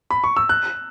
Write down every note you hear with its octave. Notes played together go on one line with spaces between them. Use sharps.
B5
C#6
E6
F#6